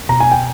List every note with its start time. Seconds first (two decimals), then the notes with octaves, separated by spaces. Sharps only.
0.09 B2 A#5
0.20 G#5
0.32 G5